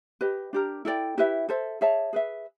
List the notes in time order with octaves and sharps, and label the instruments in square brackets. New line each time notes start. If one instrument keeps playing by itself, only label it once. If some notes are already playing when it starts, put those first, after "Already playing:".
[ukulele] G4 B4 D#5
D4 G4 A#4
E4 A4 D5 G5
E4 G4 B4 E5
A4 C5 E5
G#4 C#5 E5 A5
G#4 B4 E5